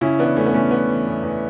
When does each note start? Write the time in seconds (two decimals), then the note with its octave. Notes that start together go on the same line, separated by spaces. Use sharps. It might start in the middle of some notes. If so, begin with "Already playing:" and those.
0.01 C#3 C#4 E4
0.19 E3 B3 D4
0.36 E2 A3 C#4
0.46 B3
0.54 E2 A3 C#4
0.71 C#3 B3
0.88 E3
1.06 E2
1.23 E2